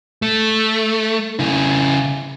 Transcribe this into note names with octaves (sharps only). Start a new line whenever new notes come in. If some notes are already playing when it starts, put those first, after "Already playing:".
A3
C#3 E4